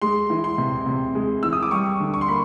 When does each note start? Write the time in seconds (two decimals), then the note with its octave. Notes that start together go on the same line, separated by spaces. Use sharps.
0.02 G#3 C6
0.30 E3
0.44 C6
0.58 C3
0.86 C3
1.15 G#3
1.43 E3 E6
1.53 D#6
1.63 D6
1.71 G3 C#6
2.00 D3
2.14 C#6
2.21 C6
2.28 A#3 B5